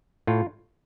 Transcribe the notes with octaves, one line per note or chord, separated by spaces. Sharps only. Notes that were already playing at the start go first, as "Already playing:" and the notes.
A2 F4